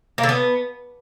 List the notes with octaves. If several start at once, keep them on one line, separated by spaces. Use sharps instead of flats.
A#3
D3
B3